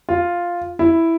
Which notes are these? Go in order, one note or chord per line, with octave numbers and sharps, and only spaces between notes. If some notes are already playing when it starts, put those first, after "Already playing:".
F4
E4